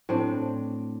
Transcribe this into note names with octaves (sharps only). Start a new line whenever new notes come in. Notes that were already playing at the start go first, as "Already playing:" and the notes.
A2 C4 D4